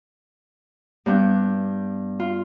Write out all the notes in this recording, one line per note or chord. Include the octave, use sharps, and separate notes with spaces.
G2 B3 D4 G6
F4